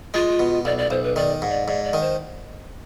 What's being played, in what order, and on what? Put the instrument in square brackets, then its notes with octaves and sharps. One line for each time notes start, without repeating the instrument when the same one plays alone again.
[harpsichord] G#3 [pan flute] F4
[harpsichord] B2
[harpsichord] B1 [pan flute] D5
[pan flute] D5
[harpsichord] B1 [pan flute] C5
[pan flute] B4
[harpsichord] D#3 [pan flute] D5
[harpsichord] G#2
[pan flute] D5
[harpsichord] G#2 [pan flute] D5
[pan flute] D5
[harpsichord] D#3
[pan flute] C5